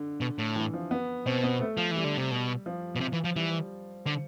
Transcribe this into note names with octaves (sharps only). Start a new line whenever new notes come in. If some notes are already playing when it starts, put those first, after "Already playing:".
Already playing: D3
B2
A2
E3
F3
B3
B2 C4
B3
A3
F3
E3
G3
D3
C3
B2
F3
B2
C3
E3
F3
E3 G3
D3